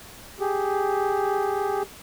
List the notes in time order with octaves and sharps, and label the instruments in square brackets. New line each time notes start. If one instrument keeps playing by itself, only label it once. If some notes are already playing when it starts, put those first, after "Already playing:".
[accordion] G4 G#4